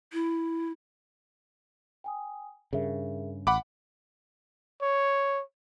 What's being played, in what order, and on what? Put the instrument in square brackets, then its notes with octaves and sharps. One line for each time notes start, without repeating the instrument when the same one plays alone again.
[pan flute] E4
[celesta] G5 G#5 D#6
[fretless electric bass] G2 C#3 [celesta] G#4 A#4 E5
[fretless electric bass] A1 [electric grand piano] F#5 B5 D6
[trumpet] C#5